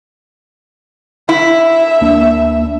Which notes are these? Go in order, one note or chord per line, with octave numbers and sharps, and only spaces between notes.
E4 E5
D2 A#3 D4